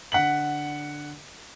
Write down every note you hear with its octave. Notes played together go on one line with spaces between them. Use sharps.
D3 F#5 B6 F#7